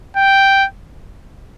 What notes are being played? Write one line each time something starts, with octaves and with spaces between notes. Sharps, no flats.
G5